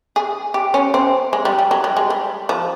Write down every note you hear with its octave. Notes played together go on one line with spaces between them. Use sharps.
G#4
G4
C#4
C4
G#3
G3
G3
F#3
G3
G#3
G3
F3